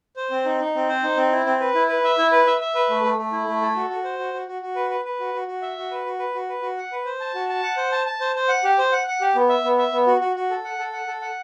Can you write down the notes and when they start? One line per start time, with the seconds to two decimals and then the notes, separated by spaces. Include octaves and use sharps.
0.17 C5
0.31 C4
0.45 D#4
0.60 D#4
0.75 C4
0.89 C5
1.03 D#4
1.17 C4
1.32 E4
1.46 C4
1.60 B4
1.75 E4
1.89 B4
2.04 E5
2.18 E4
2.32 B4
2.47 E5
2.61 E5
2.75 B4
2.90 A3
3.04 A3
3.18 A3
3.32 E4
3.47 A3
3.62 A4
3.76 F#4
3.90 F#4
4.04 C5
4.19 F#4
4.34 F#4
4.47 F#4
4.62 F#4
4.76 B4
4.91 B4
5.05 B4
5.20 F#4
5.34 F#4
5.48 F#4
5.62 E5
5.77 F#4
5.91 B4
6.06 F#4
6.19 B4
6.35 F#4
6.49 B4
6.62 F#4
6.77 F#5
6.92 B4
7.05 C5
7.20 A5
7.34 F#4
7.49 A5
7.63 F#5
7.77 C5
7.92 A5
8.06 A5
8.21 C5
8.35 C5
8.49 F#5
8.64 G4
8.78 C5
8.92 F#5
9.07 F#5
9.21 G4
9.35 B3
9.49 E5
9.64 B3
9.78 E5
9.92 B3
10.07 F#4
10.21 F#4
10.36 F#4
10.50 A4
10.64 F#5
10.79 A4
10.93 F#5
11.07 A4
11.22 F#5